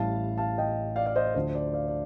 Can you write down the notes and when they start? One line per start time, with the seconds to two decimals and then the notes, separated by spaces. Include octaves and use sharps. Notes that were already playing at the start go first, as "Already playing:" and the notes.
Already playing: A1 A2 G3 F5 A5
0.38 F5 A5
0.58 D#5 G5
0.96 D5 F5
1.06 D5 F5
1.16 C5 D#5
1.26 D5
1.35 D2 D3 F3 C5
1.55 D5
1.74 D5 F5
1.88 D5